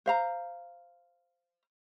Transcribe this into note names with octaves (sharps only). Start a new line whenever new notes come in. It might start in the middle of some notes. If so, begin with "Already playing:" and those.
C5 F5 A#5